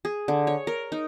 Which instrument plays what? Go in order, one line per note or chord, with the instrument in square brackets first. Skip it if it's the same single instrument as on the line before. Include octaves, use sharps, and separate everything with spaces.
[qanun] G#4
D3
C#5
A#4
D#4